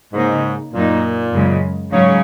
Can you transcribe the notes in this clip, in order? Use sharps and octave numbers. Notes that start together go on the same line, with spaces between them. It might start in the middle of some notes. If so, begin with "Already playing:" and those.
G#2 C#3 A#3 D#4
F#2 A#2 F#3 A#3 D#4
F#2 C#3 G#3
G#2 C#3 F#3 C#4